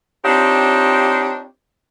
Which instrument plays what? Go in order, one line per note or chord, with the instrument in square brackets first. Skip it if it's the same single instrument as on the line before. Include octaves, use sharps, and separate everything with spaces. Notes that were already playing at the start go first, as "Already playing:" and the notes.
[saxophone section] C4 D4 D#4 F4 G4 C#5